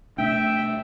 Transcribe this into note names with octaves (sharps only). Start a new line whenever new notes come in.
B2 A3 D4 E5 G5